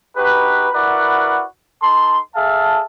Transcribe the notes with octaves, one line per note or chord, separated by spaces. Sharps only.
D#4 F#4 G4 B4
E4 F#4 A#4 B4 D5 F#5
D#4 A4 A5 C6
G#4 A4 E5 F5 A5